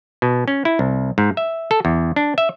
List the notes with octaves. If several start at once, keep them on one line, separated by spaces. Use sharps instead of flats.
B2
C#4
E4
C2
G#2
E5
A4
E2
D4
E5